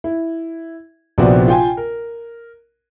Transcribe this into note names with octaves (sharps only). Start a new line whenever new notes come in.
E4
A#1 C3 F3 B3 F#4 D5
F4 G5 G#5
A#4